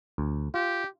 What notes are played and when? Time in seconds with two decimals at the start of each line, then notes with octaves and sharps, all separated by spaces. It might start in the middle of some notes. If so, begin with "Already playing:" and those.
0.18 D2
0.54 F4 G4